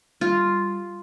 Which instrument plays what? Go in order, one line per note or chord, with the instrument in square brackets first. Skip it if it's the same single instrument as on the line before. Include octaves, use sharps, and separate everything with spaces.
[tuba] G3 [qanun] F4